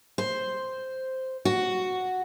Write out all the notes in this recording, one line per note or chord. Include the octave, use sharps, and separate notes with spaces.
C5
F#4